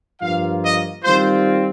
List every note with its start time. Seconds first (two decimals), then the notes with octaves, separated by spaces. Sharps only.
0.21 G2 F3 A#3 F4 F5
0.62 D#5
1.03 D#3 G3 C4 F4 C5